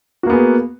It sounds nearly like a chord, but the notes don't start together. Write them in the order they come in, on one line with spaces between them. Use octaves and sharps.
F#4 A#3 B3 G#4